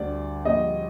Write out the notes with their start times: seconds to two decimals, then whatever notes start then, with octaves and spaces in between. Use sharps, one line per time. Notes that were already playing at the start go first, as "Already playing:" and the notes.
Already playing: D2 D3 G3 D5
0.45 A#1 A#2 G3 D#5